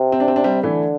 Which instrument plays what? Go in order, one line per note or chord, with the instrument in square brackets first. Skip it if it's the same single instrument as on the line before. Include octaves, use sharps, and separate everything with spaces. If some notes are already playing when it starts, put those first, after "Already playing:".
Already playing: [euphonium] C3
[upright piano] C4
D4
C4
D4
G3 C4
[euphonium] D3 [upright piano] E3 A3